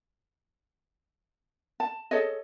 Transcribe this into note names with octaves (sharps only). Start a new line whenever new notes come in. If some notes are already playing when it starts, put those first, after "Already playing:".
A5
G#4 A4 C#5 D#5